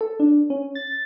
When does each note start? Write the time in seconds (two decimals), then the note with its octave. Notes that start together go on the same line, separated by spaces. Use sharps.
0.01 A4
0.20 D4
0.50 C#4
0.75 A6